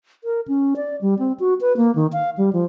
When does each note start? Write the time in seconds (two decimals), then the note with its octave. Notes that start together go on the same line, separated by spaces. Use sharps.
0.24 A#4
0.48 C#4
0.76 D5
1.01 G3
1.19 C4
1.40 F#4
1.61 B4
1.77 A#3
1.95 D#3
2.13 F5
2.37 G3
2.53 F3